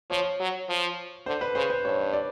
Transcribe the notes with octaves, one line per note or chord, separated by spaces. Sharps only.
F3 C#5
F#3
F3
D3 C5
B4
C#3 C5
C5
G2 C#5
D5